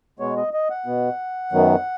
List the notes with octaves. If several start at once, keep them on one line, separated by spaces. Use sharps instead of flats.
B2 G#3 B3 C#5
D#5
D#5
F#5
B2 B3
F#2 D#3 F#3 B3